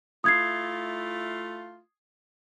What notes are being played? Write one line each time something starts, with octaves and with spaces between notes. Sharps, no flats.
A3 E4 F4 D#6 G#6 C7